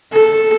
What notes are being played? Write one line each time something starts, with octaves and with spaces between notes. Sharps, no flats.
A4